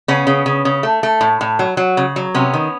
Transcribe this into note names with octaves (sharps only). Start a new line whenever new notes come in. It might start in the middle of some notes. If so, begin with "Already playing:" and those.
C#3 B3 C#4
C#3
C#3
C#3
A3
A3
A2
A2
F#3
F#3
C#3
F#3
C3 B3 C#4
D#3